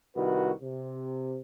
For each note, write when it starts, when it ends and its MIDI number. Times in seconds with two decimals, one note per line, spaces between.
0.16 0.51 36
0.16 0.51 51
0.16 0.51 66
0.16 0.51 71
0.62 1.40 48